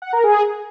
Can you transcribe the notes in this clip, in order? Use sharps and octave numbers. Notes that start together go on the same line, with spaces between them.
F#5
A#4
G#4